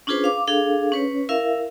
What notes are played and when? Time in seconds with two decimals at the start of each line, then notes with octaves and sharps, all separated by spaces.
0.07 C#4 D4 F4 G#4 B4 C5
0.24 F5 D6
0.47 D4 G#4 A4 F5
0.92 C#4 B4 C#5
1.29 E4 A#4 E5 F5